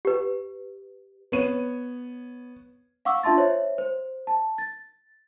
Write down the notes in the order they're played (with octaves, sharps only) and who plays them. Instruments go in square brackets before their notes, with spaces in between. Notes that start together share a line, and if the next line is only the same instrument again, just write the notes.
[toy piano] G4 B4
[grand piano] B3 C#5 D#7
[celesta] F5 F#5 C#6 D6 E6
D4 F4 E5 A5 C6 A6
C5 C#5 E5
C5
A5
A6